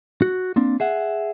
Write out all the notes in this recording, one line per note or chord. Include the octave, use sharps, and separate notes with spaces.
F#4
A#3 C4 D4
G#4 E5 F#5